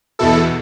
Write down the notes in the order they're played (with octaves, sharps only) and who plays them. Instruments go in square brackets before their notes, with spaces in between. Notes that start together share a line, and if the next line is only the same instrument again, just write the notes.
[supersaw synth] E2 B2 E4 A4